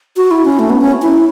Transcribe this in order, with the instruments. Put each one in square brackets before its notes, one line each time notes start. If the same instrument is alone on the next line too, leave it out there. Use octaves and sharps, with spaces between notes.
[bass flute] F#4
E4
C#4
A3
B3
C#4
E4